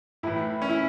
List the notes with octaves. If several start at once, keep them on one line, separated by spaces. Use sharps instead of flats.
A2 E3 E4
C#4
E4